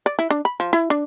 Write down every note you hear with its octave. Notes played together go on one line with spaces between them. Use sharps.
D5
E4
D4
B5
F3
E4
D4